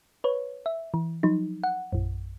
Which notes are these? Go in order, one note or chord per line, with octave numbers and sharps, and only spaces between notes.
B4 C#5
E5
E3
F3 F#3 D#4
F#5
A#1 F#2